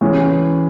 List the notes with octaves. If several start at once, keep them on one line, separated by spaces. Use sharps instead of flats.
E3 G#3 C#4